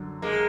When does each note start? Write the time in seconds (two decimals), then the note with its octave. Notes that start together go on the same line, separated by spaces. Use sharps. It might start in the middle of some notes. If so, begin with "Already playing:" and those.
Already playing: F#2 D3 F#3
0.22 G#3 A#3